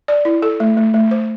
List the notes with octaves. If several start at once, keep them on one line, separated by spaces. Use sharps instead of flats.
D5
E4
A4
A3
A3
A3
C5